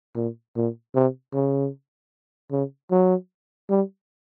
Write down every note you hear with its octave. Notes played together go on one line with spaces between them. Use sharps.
A#2
A#2
C3
C#3
C#3
F#3
G3